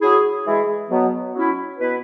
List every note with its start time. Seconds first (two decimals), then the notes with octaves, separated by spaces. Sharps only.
0.02 F#3 E4 G#4
0.46 E3 G#3 E4 G#4
0.90 B2 F#3 B3
1.35 F#3 C#4 E4
1.79 B2 B3 E4 B4